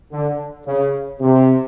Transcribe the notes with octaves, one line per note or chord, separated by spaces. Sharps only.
D3
C#3
C3